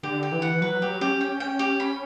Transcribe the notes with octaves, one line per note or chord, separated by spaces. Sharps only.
D3 G4
G4
E3
F#5
F#3 B4
F#3 G4
C#4 G4
G5
G5
G4
B5